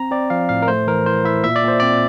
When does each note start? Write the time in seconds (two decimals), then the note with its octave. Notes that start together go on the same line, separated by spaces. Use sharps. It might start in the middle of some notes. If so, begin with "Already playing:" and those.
Already playing: C4 A#5
0.11 C4 D5
0.30 F3 F5
0.49 A2 F5
0.62 A#4
0.68 A3 C5
0.87 E3 A#4
1.06 E4 C5
1.25 E4 E5
1.44 A#2 E5
1.56 D5
1.64 A#2 C5
1.80 C4 D5